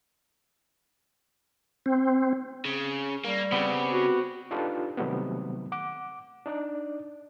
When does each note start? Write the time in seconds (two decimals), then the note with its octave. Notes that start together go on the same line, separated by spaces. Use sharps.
1.86 C4
2.65 C#3
3.25 G3 A#3
3.52 C#3 B3 C4 G4
3.92 F#4
4.51 D4 D#4 F4 G4 A4 B4
4.97 C3 D#3 F#3 G3 A3 B3
5.72 F#5 D6
6.46 D4 D#4 D5